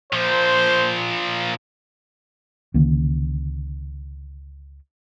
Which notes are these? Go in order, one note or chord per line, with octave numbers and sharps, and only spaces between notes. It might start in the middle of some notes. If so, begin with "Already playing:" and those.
A#2 F3 C5
C#2 D3 D#3 A#3